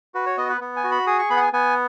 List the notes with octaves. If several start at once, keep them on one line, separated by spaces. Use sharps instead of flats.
F#4 B4
C#5
B3 D#5
B4
B3
G#5
F#4
B5
G#4 D#6
C#6
B3 B5
F#5
G#5
B3 G#5